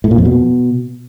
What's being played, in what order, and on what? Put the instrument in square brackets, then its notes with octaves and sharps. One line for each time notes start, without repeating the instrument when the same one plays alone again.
[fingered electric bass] A2
A#2
F2
B2